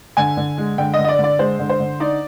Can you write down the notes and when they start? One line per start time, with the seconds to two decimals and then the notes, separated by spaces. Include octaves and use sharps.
0.17 D3 G#5
0.37 D3
0.58 G#3
0.78 D3 G5
0.94 D#5
0.99 D3
1.04 D#5
1.09 D5
1.19 D3
1.24 D5
1.39 G#3 C5
1.59 D3
1.70 C5
1.80 D3
2.00 D#4 D5